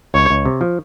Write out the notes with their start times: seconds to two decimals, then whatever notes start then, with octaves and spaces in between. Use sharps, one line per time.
0.14 C#2 C#5
0.30 C#2
0.45 C3
0.61 F3